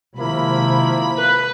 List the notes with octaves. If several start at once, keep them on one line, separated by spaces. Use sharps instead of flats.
C3 D#3 F3 G#3 A#3 E4 B5
B4